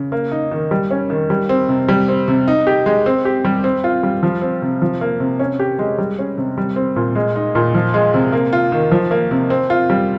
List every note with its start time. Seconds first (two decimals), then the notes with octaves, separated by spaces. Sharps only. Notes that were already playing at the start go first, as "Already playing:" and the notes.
Already playing: C#3
0.12 A#3
0.32 D#4
0.52 D#3
0.71 G3
0.91 C#4
1.10 D#3
1.30 G3
1.49 C4
1.69 C3
1.88 G3
2.08 C4
2.28 C3
2.48 D#4
2.67 G4
2.86 G#3
3.06 C4
3.25 G4
3.45 G3
3.64 C4
3.84 F4
4.03 G3
4.23 F3
4.42 C4
4.62 C3
4.82 F3
5.01 A#3
5.20 C3
5.39 C#4
5.59 G4
5.79 G#3
5.98 G3
6.19 C#4
6.38 C3
6.58 G3
6.76 C4
6.96 A#2
7.15 G#3
7.36 D#4
7.55 A#2
7.75 F3
7.94 G#3
8.14 C3
8.32 A#3
8.53 F4
8.72 D#3
8.92 F3
9.11 A#3
9.31 C3
9.50 C4
9.70 F4
9.90 G3